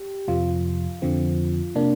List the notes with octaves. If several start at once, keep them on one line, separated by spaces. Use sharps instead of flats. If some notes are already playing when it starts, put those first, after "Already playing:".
Already playing: G4
F2 C3 F3 F4
F2 D3 F3 C4
C3 A#3 D4